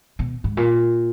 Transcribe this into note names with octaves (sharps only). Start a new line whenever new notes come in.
B2
G#2
A#2